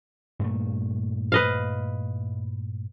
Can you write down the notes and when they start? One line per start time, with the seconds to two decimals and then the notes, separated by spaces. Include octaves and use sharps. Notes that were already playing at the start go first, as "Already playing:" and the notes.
0.39 G2 A#2 A3
1.32 B4 D#5 F5